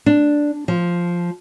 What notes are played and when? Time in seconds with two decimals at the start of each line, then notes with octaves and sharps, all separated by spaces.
0.06 D4
0.68 F3